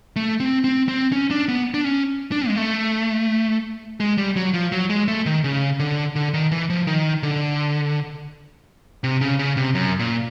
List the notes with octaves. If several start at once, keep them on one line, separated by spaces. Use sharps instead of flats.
A3
C4
C4
C4
C#4
D4
B3
D4
C#4
D4
G#3
A3
G#3
G3
F#3
F3
F#3
G#3
A3
D#3
C#3
D3
D3
D#3
E3
F3
D#3
D3
C3
C#3
C#3
C3
F#2
A#2